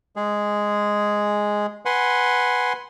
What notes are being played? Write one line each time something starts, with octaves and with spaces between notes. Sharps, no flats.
G#3 G#4
B4 F#5 G#5 C6